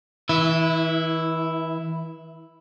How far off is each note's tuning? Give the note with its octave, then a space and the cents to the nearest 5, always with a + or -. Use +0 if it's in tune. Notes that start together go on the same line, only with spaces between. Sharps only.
E3 -35 E4 +0